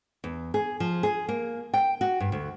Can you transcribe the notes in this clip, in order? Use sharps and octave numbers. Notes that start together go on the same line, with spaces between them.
E2
G#4
F3
G#4
A#3
G5
F#4
G2
D2